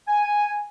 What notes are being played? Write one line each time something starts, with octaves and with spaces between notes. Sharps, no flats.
G#5